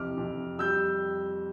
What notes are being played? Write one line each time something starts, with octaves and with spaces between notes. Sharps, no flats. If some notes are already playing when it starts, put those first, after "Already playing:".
Already playing: F2 C3 E3 D6 F6
F2
G3 E6 G6